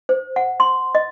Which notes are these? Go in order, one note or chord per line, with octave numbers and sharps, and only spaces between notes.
C5
F#5
C6
D#5